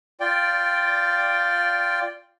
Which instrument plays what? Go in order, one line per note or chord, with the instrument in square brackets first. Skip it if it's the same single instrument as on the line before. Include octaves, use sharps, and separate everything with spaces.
[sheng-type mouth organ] F4 D5 G5